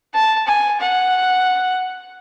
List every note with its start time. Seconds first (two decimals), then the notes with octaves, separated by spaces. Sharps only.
0.14 A5
0.47 G#5
0.80 F#5